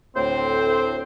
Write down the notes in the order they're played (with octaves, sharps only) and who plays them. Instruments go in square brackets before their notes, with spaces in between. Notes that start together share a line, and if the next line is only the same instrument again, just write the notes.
[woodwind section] D2 A2 C4 C5